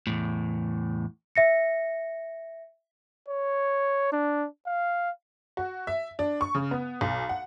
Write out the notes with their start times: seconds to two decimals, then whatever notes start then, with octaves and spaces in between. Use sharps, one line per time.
0.07 E2 A2
1.36 E5 A#6 C#7
3.28 C#5
4.12 D4
4.66 F5
5.57 F#4
5.87 E5
6.19 D4
6.41 C#6
6.55 C#3
6.71 B3
7.01 B1
7.29 F#5